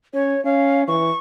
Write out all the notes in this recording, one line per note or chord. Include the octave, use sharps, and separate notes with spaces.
C#4 C#5
C#4 F5
E3 C#6